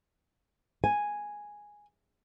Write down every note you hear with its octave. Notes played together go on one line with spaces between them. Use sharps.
G#5